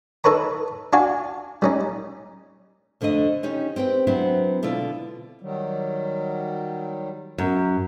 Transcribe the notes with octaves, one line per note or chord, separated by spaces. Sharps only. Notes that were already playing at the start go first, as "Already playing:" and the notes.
D#4 A4 B4 C#5 A#5
D4 F#4 F5 G#5
G3 C#4 D#4
F2 D3 A3 D4 D#5
C#4 D#4 G4
C4 G4 B4 G5
F#3 B3 C4 D4 E4
B2 D3 E4 F4 D5
D#3 F#3 G3
F#2